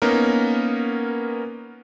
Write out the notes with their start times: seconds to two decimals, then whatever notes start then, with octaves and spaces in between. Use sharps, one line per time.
0.02 A#3 B3 C#4 D#4 A#4